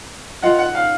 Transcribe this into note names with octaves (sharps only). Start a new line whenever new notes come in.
F4 A#4 D#5 F#5 G5
F#5
F5